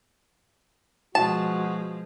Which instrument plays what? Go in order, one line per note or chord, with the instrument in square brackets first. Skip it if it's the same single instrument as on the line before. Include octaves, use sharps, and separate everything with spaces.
[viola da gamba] B2 F3 G#3 [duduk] F#4 [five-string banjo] A5